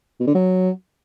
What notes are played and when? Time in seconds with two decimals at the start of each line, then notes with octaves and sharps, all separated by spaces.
0.20 B2
0.27 D3
0.35 F#3